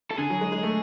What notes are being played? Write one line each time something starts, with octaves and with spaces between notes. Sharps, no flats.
A4
D3 G#4
F#3
G#3
G#3
A3